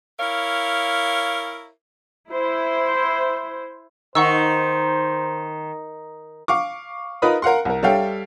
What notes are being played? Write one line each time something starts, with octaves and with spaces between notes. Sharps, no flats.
E4 A#4 C#5 F5
E4 C5
D#3 C5 F#5 C#6 E6
F5 C#6 D6
D#4 F4 A#4 B4 B5 D#6
A#4 F5 F#5 C6
C2 A#4
G3 A4 C#5 E5 F5 G5